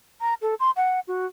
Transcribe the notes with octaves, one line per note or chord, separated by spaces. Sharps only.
A#5
A4
C6
F#5
F#4